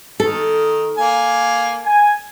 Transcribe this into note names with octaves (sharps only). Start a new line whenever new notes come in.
D#3 A4
A#3 G#5
G#5